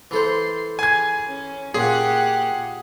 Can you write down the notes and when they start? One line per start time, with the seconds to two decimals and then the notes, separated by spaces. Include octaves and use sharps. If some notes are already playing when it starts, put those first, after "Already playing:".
0.11 E3 A4 C5 C6
0.79 G#4 G#5 G#6
1.28 C#4
1.74 A#2 G4 G#4 F#5